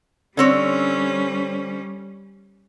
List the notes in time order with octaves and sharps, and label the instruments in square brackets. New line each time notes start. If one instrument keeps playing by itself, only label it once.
[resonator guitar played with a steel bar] D3 C4 C#5 [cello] G3 C#4